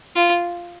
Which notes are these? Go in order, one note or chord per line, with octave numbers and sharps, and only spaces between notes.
F4